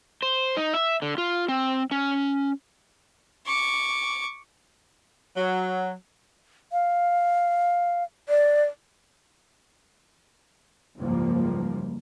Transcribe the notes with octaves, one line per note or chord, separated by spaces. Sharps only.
C5
D#4
E5
D3
F4
C4
C#4
C#6 D6
F#3
F5
D5
F#1 C#2 G#2 F3 G3 A#3